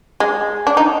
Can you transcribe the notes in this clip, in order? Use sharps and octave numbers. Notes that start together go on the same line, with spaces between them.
G#3
D4
D#4